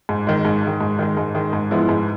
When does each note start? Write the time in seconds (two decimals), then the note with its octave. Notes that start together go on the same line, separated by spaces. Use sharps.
0.09 G#2
0.27 D#3 G#3
0.45 G#2
0.63 D#3 G#3
0.81 G#2
0.99 D#3 G#3
1.17 G#2
1.35 D#3 G#3
1.53 G#2
1.71 F3 G#3 B3 E4
1.89 G#2